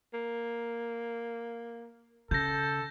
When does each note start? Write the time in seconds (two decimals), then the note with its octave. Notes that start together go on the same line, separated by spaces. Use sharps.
0.13 A#3
2.31 C#3 A4 G6 A#6